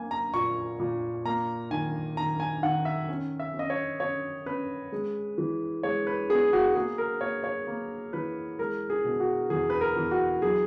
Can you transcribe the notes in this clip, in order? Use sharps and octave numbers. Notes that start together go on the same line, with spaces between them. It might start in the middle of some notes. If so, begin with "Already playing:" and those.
Already playing: A#3 G#5
A#5
A#2 C#6
A#2
A#3 A#5
D#3 G#5
D#3 A#5
G#5
D#3 F#5
E5
C#4
E5
C#4
D#5
C#5
C#4 C#5
C#4 B4
G#3
E3
G#3 C#5
B4
B3 G#4
F#4
A#3 G#4
A#4
A#3 C#5
C#5
A#3
E3 B4
G#3 A#4
G#4
B2
F#4
E2 G#4
B4
A#4
E2
F#4
F#3 G#4